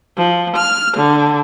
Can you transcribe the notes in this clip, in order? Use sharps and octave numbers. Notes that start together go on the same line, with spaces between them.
F3
F6
D3